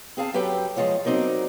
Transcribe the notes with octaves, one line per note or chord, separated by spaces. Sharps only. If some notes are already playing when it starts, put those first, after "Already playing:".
C4 G#4 F5 A5
F#2 F#3 G4 A4 B4 G5
F3 G#3 F4 C#5
F#3 C4 D#4 A#4 D5